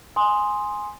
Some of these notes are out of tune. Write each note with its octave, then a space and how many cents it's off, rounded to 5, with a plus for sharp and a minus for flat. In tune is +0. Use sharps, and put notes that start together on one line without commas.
G#5 +0 C6 +0 D#6 +0